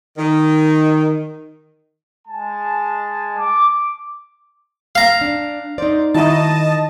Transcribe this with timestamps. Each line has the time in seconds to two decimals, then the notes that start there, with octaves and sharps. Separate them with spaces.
0.18 D#3
2.27 G#3 G#5 A5
3.37 D6
4.95 F5 A#5
5.21 D4
5.78 D#4 C5 D5
6.14 D#3 D#4 E4 F#4 D#5 A5